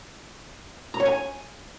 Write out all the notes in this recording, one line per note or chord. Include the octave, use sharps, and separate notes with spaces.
A#5
C#5
G#5